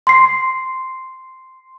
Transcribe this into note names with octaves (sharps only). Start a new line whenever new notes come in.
C6 C7